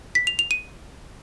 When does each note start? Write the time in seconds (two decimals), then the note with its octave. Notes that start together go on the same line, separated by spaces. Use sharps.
0.15 B6
0.27 F7
0.39 F7
0.51 D#7